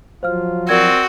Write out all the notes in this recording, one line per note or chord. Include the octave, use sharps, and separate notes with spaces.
F3 F#3 F4 C5 F5 F6
C4 F#4 A#4 D5 G#6